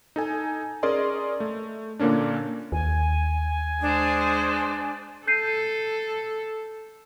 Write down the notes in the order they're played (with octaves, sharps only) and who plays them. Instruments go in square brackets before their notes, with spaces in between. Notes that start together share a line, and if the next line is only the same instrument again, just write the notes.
[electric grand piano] D#4 A4 G#5
C#4 G#4 A#4 D5 D#5 C6
A3
A#2 D3 A#3 C#4 D4
[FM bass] D#2 [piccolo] G#5
[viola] G#3 C5 [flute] D4
[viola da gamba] A4 [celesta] G6 C7 D#7